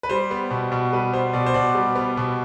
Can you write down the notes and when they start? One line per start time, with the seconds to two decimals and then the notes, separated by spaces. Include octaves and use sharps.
0.03 B4
0.09 G3 C5
0.31 B3
0.51 B2
0.72 B2
0.93 G3 B4
1.13 B3 C5
1.33 B2 D5
1.46 C5
1.54 B2 D5
1.75 G3
1.96 B3
2.17 B2